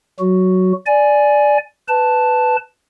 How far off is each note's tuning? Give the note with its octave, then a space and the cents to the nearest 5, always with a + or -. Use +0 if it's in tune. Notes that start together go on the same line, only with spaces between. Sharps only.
F#3 +10 F#4 +0
D5 +0 G#5 +10
B4 +10 A5 +0